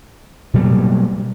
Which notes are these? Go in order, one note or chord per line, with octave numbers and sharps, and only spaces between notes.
B2 F#3 G3 A#3